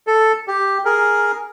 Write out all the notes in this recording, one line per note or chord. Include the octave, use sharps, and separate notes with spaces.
A4
G4
G#4 A#4